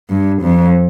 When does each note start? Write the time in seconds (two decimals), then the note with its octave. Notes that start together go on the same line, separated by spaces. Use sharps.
0.10 G2
0.42 F2